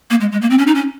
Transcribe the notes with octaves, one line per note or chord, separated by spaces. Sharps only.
A#3
G#3
G#3
A#3
C4
C#4
D#4
C#4